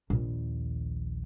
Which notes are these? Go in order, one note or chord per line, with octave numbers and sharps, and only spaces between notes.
A#1 D#2